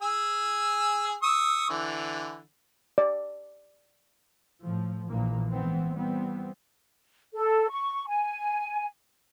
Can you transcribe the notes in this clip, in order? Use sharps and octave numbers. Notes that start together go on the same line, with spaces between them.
G#4 G#5 E6
C#6 D#6 E6
D3 E3
D5
A2 F3
A#1 A#2 E3 F3 A#3
G#2 E3 B3 C4
E3 G3 B3 C4
A4
C#6
G#5